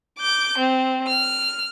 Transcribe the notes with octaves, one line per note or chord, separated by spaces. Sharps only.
D6 G6
C4
F6